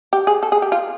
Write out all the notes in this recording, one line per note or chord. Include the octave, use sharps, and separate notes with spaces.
G4
G#4
A4
G#4
G4
F4